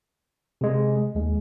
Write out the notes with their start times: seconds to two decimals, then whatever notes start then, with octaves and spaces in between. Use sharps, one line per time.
0.61 C3 G#3
1.15 D#2 G#3